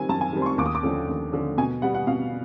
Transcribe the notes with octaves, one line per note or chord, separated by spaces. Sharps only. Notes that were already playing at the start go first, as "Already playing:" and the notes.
Already playing: D#3 G3 C4 G#5
F#2 A5
G#5
D#3 G3 C4
C6
C#6
D#2 D6
D#6
D6
D3 F3 A3 C#4
D#2
D3 F3 A3 C#4
B2 G#5
G3 B3 F#5
F#5
B2 F5